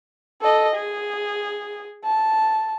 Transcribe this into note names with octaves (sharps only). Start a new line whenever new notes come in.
A4 D#5
G#4
A5